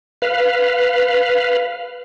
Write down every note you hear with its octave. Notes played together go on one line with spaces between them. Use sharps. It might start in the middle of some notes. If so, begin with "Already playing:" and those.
B4 F5